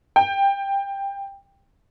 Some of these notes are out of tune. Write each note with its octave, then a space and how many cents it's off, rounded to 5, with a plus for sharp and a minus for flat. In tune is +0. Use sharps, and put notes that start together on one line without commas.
G5 +15